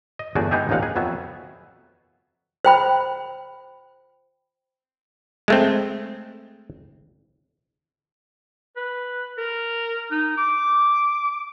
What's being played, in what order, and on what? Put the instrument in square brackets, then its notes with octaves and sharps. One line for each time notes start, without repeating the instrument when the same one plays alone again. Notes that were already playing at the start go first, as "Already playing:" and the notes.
[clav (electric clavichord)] D#5
G1 E2 A3 F#4 G#4 D5
G#3 B3 D#4 G4 G#4 E5
A1 D#2 A#2 D#4 F5 F#5
G#4
F2 F#3 B3 E5
[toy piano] C5 G5 B5
[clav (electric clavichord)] G#3 A3 C4
[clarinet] B4
A#4
D#4
D6